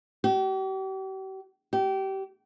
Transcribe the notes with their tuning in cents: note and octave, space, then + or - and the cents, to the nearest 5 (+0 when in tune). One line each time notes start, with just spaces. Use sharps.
G4 -40
G4 -25